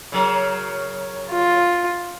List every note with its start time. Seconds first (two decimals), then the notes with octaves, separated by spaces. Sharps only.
0.12 C#3 F#3 A#4
1.31 F4